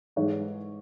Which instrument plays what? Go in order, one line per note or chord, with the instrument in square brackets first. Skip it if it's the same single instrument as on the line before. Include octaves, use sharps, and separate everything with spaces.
[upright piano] G#2 E3 G#3 C#5